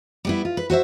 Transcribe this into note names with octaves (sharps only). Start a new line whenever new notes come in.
G3 B3 E4
F4
B4
F#4 C5 D#5 E5